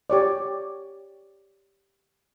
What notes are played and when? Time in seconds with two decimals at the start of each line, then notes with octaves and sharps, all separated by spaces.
0.10 G4 C#5 D5